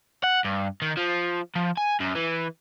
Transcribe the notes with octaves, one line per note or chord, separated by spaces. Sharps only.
F#5
G2
D#3
F3
F3
G#5
F#2
E3